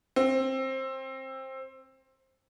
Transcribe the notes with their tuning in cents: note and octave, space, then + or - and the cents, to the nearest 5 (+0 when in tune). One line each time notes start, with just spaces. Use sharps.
C4 +20